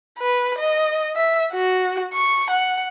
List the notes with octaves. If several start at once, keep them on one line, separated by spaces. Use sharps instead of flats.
B4
D#5
E5
F#4
C#6
F#5